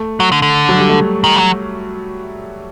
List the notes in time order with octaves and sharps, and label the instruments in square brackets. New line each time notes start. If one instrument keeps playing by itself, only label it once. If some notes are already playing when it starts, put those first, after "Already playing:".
Already playing: [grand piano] A3
[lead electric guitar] F#3
D3
D3
[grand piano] F#3
G3
A3
[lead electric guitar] D#3
F#3